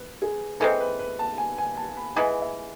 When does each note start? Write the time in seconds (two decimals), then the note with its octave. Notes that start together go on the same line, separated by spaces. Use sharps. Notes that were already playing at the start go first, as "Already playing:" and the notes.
Already playing: B4
0.22 G#4
0.60 E3 G#3 C4 A4
0.80 B4
0.99 B4
1.19 A5
1.38 G#5
1.58 G#5
1.77 A5
1.97 B5
2.16 E3 G#3 B3 G#5
2.42 E5